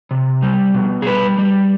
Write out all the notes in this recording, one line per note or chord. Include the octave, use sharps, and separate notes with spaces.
C3
G3
B2
G#4
G3 B4
G3